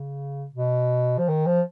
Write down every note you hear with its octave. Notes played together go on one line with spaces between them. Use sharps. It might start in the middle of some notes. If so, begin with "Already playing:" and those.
Already playing: C#3
B2
F3
D#3
F3